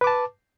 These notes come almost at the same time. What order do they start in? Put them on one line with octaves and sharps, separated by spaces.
B4 D6 A5